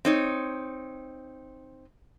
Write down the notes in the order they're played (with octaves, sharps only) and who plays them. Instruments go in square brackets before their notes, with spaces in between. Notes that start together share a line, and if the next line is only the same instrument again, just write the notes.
[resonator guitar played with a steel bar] C4 D#4 C#5